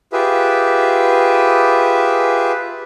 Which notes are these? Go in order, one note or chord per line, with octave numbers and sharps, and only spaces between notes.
F4 G4 G#4 B4 E5